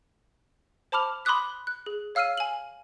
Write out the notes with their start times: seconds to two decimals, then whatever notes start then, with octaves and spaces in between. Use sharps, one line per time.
0.92 C5 A5 B5 D6 F6 F7
1.25 B5 C6 D6 D#6 F#6 B6
1.67 F#6
1.86 G#4
2.15 C#5 F5 E6 F6 C7 D#7
2.37 G#5 F#7